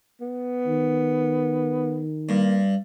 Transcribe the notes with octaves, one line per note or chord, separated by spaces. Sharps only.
B3
D#3
G2 A#3